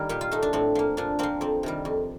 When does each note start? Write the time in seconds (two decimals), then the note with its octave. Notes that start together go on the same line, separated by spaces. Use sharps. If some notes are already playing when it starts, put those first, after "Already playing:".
Already playing: D#3 G3 A#3
0.09 A#2 G4
0.21 F4
0.31 A3 D#4
0.42 D4
0.53 A2 C4
0.75 F3 A#3
0.97 A#2 D4
1.19 F3 A#3 C4
1.41 F2 C4
1.63 C3 D#3 G3
1.85 F2